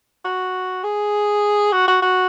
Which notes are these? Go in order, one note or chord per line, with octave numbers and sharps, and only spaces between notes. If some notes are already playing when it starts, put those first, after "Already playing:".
F#4
G#4
F#4
F#4
F#4